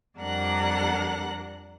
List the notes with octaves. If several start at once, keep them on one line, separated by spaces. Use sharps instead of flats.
F2 G3 D4 A#4 F#5 F#6